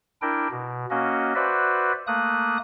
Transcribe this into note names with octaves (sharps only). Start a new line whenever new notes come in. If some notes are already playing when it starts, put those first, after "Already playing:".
D4 E4 A#4 G5
B2
A#3 C#4 F#4 D#5
F#4 B4 C5 D5 E5
A3 A#3 D#6 F#6